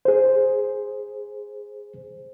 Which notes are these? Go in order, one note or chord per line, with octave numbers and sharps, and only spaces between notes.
G#4 C5